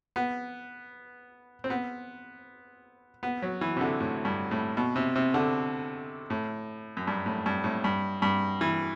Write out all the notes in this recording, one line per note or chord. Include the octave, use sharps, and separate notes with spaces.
B3
C4
B3
B3
F#3
E3
C3
D3
A2
G2
A2
B2
C3
C3
D3
A2
F#2
G2
A2
G2
A2
G2
G2
E3